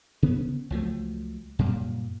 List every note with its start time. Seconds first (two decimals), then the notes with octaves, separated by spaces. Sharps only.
0.23 C#3 B3 C#4
0.70 C#2 F3 F#3 A3
1.59 F#2 A#2 G3